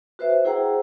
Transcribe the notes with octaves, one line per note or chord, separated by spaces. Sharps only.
F#4 B4 C5 E5
E4 G#4 C5 F#5 G5 A#5